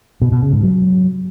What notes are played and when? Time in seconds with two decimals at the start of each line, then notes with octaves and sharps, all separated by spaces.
0.22 B2
0.32 B2
0.42 C#3
0.53 G#2
0.63 F#3